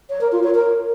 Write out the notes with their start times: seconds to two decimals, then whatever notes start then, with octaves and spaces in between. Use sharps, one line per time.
0.10 C#5
0.21 A#4
0.32 F4
0.43 C#5
0.55 A#4